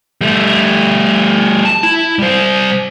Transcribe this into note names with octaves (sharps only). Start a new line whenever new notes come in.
G3 A3
A5
E4
G3 C5